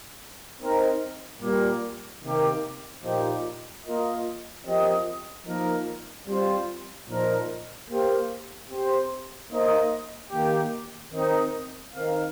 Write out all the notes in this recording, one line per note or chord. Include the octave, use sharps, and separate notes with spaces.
C4 D#4 A#4
A#2 G3 A#3
C3 D#3 A#3 G4
A#2 F3 D#4 G4
A#3 F4 A#4 D#5
F3 C4 G4 A#4 D#5
F3 A#3 D#4 A#4
G3 C4 F4 C5
A#2 F3 D#4 A#4
A#3 G4 C5 F5
C4 G4 C5
A#3 D#4 C5 D#5
D#3 A#3 G4
D#3 C4 D#4
D#3 C4 D#4 A#4 F5